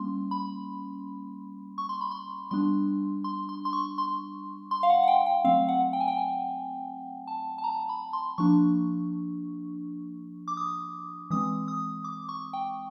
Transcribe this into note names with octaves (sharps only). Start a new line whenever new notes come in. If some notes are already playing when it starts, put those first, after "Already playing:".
Already playing: G3 A#3 C#4 C6
B5
C#6
C6
B5
C6
G3 B3 D4 C6
C6
C6
C6
C#6
C6
C6
F5
F#5
F#5
G5
G5
F#3 A3 C4 F5
F#5
G5
G#5
G5
G#5
A5
A5
A#5
B5
C6
F3 A#3 D4 C#6
D6
D#6
E3 G#3 C4 D#6
D#6
D6
C#6
G5